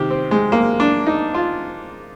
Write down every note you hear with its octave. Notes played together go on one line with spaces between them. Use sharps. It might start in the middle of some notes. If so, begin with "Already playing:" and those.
Already playing: C3 D#3 G4
C4
G#3
A#3
D4
D#4
F4